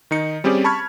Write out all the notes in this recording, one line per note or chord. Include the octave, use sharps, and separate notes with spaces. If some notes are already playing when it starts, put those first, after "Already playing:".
D#3 D#4 C#7
G3 C4 C#4 G4 G#4 D5
A5 B5 C#6 F6 G#6